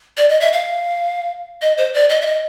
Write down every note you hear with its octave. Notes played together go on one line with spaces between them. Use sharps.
D5
D#5
E5
F5
D#5
C5
D5
D#5
E5
D#5